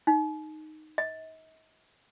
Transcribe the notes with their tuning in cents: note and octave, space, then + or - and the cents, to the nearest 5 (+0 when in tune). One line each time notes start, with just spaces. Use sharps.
D#4 -5
D#5 +45